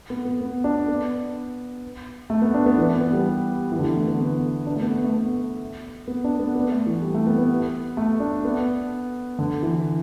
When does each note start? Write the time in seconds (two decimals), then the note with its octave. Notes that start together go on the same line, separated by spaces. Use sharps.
0.10 B3
0.25 B3
0.41 B3
0.64 D4
0.88 B3
2.30 A3
2.42 B3
2.54 D4
2.66 B3
2.77 E3
2.90 B3
3.01 B3
3.13 G3
3.72 E3
3.79 D3
3.83 E3
3.96 A3
4.08 B3
4.19 B3
4.66 D4
4.76 A3
4.82 B3
5.04 A3
5.13 B3
6.08 B3
6.24 D4
6.39 B3
6.56 B3
6.72 A3
6.86 E3
7.02 G3
7.14 A3
7.27 B3
7.39 B3
7.97 A3
8.20 D4
8.45 B3
9.39 D3
9.63 E3